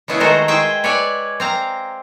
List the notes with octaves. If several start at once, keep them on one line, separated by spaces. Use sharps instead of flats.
C#3 G#3 B3 E4 G#4
D#3 G#3 A3 F#4 A#4 C5
G#3 G#4 C5 E5 G5
B4 C#5 D5 E5 G#5
C4 F5 A#5